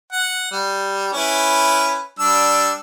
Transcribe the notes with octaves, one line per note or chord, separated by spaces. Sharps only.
F#5
G3
C#4 E4 B4
G3 D4 E6